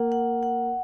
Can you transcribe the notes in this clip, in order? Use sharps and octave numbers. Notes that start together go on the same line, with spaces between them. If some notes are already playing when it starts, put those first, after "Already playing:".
Already playing: A#3 F#5
F#5
F#5